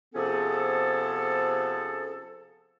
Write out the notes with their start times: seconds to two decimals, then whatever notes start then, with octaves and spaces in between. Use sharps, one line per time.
0.14 C3 F3 B3 C#4 G#4 A4